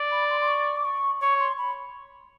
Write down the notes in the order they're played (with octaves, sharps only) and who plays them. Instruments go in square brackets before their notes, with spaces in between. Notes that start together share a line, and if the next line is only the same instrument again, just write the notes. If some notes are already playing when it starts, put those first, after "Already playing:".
Already playing: [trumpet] D5
[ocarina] B5
C6
C6
C#6
D6
C#6
[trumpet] C#5 [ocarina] C#6
[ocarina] C6
B5